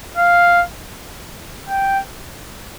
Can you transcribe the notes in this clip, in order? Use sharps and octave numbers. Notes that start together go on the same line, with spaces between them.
F5
G5